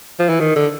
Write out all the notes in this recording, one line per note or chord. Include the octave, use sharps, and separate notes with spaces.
F3
E3
D#3
D3